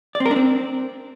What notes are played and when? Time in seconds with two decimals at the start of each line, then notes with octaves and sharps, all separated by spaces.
0.15 D5
0.20 C4
0.26 A#4
0.31 D4
0.36 C4